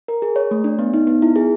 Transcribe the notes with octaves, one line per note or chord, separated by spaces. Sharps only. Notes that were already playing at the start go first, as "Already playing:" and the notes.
A#4
G#4
C#5
A3
D4
B3
D#4
B3
E4
G#4